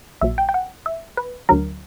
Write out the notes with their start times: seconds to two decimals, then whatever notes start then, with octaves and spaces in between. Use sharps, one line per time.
0.21 A#1 A#2 F#3 E5
0.38 G5
0.49 G5
0.54 F#5
0.86 E5
1.17 B4
1.49 D2 D3 F#3 A#4